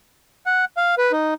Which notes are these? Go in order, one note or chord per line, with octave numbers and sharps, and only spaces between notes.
F#5
F5
B4
D#4